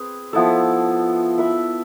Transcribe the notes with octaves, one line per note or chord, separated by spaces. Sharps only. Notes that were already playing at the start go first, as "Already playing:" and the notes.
Already playing: C4 G#4 B4
F3 B3 E4 A4
E4 B4 E5